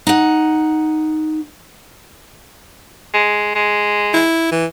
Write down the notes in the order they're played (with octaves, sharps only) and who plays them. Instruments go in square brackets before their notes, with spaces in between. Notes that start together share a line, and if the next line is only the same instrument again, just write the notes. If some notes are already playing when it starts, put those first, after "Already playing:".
[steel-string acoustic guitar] D#4 F#5
[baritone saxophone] G#3
G#3
[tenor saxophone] E4
E3